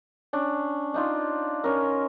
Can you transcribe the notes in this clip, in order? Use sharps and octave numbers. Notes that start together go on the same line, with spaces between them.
C#4 D4
D4 D#4 F4
C#4 A#4